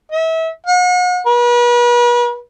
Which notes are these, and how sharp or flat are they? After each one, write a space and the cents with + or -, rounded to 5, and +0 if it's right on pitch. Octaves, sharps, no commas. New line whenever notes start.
E5 -30
F#5 -40
B4 -40